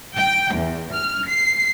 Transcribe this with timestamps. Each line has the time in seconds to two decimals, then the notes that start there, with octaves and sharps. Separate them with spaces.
0.16 G5
0.54 E2
0.94 F6
1.28 C7